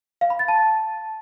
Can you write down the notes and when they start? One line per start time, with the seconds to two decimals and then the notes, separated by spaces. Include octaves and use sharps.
0.21 F5
0.30 B5
0.39 A6
0.48 A5